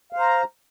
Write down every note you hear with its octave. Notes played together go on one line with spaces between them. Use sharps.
C5 F5 A#5